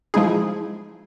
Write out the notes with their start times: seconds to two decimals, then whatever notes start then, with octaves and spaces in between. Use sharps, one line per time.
0.14 F3 G#3 D#4 E4 G#4